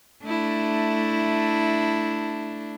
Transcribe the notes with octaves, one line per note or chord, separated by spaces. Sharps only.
A3 D4 E4